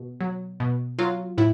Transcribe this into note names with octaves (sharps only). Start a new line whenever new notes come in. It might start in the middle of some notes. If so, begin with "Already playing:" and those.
Already playing: B2
F#3
B2
F#3 F4
A2 E4